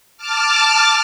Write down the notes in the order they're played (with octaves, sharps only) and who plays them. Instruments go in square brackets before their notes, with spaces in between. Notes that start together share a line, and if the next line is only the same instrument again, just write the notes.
[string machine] A5 D6 F6